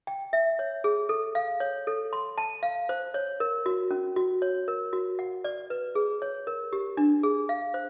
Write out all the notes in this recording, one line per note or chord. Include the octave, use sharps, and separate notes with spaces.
G5
E5
C#5
G#4
A4
F5
C#5
A4
C6
A5
F5
C5
C#5
A#4
F#4
C#4
F#4
C#5
A#4
F#4
F#5
D5
B4
G#4
C#5
A#4
G4
D4
G#4
F5
C5